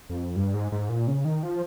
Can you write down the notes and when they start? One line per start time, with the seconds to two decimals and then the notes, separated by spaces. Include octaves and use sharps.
0.10 F2
0.36 G2
0.54 G#2
0.72 G#2
0.89 A#2
1.07 C#3
1.25 D#3
1.43 F3